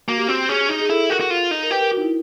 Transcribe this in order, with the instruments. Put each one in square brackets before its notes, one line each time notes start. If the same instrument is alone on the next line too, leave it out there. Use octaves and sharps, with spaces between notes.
[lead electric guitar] A#3 [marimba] F#4
[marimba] G4
[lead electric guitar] C4 [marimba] F#4
[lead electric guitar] C#4 [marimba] G#4
[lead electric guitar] D#4
[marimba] G#4
[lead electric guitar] E4 [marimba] A4
[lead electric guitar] F#4 [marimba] A#4
[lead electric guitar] F#4
F4
D#4
[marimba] A#4
[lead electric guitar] G4 [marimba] B4
[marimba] A#4
F#4
D#4
E4